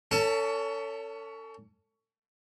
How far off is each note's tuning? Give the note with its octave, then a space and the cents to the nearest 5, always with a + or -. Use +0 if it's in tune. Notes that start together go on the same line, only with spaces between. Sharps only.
C#4 +25 A4 +35 A5 +0